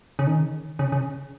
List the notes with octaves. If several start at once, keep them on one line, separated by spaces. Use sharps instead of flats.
C#3
D#3
C#3
C#3